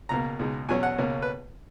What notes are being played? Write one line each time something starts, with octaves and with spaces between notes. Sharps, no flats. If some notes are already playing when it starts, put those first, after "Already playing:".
C#2 B2 A#3 A#5
C#2 B2 G#3 D#4
E2 B2 F#3 C#4 G#5
F#5
C#2 B2 A#3 C#4
B4